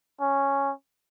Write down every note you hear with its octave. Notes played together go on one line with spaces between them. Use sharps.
C#4